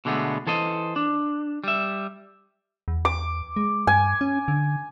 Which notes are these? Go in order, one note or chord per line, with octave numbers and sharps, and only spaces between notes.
B2 D3 G#3 A3 B3
E3 A4 C5 D#5
D4
G3 E5
E2
D6
G#3
G2 G#5
C#4
D3